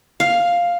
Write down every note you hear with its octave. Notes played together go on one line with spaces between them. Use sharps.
F5